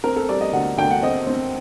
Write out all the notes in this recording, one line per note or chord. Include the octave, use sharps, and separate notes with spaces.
C4 A#4
A4
G3 D5
D#5
D2 F#5
D2 G5
F#5
C4 D#5
C4